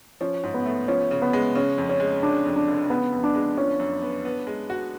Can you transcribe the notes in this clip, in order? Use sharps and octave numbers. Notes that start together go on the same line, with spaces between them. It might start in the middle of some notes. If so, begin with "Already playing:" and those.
F3 C#4
G#2
B3
A3
F3 C#4
C#3
B3
G#3
C#3 C#4
F2
C#4
G#3
C#3 D4
F2
D4
F1
C#3 B3
F2
D4
G#3
F3 C#4
F#2
B3
B3
G#3
F#4